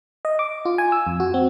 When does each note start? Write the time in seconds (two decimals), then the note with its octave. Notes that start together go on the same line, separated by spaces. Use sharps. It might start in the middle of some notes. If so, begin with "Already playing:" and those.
0.25 D#5
0.39 D6
0.65 F4
0.78 G#5
0.92 E6
1.07 F2
1.20 F#4
1.34 C4